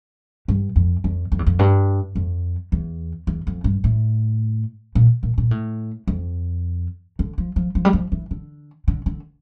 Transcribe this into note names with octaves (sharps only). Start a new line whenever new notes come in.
G2
F2
F2
F2
E2
F2
G2
F2
E2
E2
F2
G2
A2
A#2
A#2
A#2
A2
F2
D3
F3
F3
F3
G3
F3
E3
D3
D3
D3